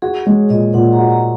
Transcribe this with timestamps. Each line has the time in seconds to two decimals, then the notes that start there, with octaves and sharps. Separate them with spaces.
0.02 F#4 G#4
0.26 G#3 C#5
0.50 A#2 D#5
0.74 A#2 F#5
0.93 A#5
0.99 F#4
1.10 A#5